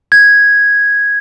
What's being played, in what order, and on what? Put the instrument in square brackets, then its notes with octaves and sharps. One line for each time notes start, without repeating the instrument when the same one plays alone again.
[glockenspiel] G#6